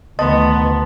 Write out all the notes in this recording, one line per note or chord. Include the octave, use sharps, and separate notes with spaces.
D2 D#3 B3 D#5 A5 C6 A6